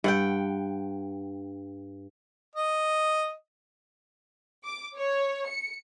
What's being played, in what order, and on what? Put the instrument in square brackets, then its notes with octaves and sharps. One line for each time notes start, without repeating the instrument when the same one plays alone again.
[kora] G2 F#5 G5
[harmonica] D#5
[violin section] D6
C#5
C#7